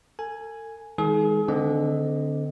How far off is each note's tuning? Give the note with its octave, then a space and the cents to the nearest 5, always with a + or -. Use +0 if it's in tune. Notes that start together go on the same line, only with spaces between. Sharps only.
A4 +40 G#5 +0
D#3 +25 G#3 -20 G#4 +35
D3 +0 C4 -30 D#5 +0